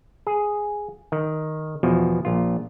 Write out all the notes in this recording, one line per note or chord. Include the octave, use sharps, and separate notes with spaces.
G#4
D#3
E2 B2 F3
A#1 F4